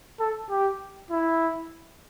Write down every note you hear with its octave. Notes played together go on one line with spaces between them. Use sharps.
A4
G4
E4